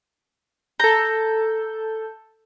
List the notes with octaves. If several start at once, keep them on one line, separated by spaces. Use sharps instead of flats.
A4 A#5 G6